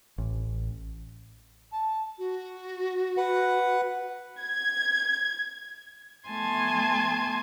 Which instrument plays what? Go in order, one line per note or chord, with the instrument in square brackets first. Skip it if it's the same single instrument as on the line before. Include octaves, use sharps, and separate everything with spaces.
[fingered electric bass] A1
[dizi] A5
F#4
[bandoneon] B4 F#5
[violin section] G#6
[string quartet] A3 B3 G#5 A5 C6 G#6